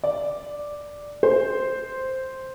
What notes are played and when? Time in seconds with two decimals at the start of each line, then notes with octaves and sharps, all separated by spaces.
0.04 D5
1.23 C5